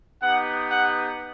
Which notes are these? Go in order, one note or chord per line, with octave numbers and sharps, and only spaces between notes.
B3 D#4 G4 F#5
F#5